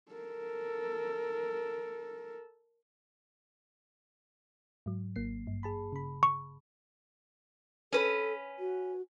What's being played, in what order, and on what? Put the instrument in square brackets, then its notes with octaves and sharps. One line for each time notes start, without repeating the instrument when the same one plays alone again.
[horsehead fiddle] A4 A#4
[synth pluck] G#2 F#3
G#1 A#3 C7
G2
G#4 A5 B5
C#3 B5
[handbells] C#6
[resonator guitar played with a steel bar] C#4 B4 [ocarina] A4
[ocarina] F#4